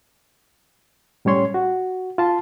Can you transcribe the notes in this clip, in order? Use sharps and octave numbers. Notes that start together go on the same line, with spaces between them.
A2 G3 C#4 C#5 C6
F#4
F4 A5 C6